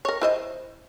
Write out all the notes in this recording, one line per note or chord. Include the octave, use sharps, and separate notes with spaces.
A#4 C#5
E4 C5 D#5